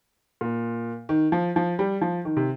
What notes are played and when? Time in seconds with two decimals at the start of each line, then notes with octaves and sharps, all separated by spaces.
0.41 A#2
1.09 D#3
1.32 F3
1.56 F3
1.79 G3
2.01 F3
2.25 D#3
2.37 C3